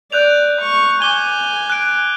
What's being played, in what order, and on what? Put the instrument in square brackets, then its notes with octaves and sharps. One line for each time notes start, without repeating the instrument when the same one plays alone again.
[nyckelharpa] D5 [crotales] F#6 G6 F7
[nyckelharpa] C#6
[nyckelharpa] G#5 [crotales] D6 G7
[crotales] F#6 D7